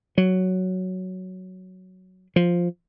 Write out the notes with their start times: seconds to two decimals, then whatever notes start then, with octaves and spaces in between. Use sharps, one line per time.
0.18 F#3
2.36 F3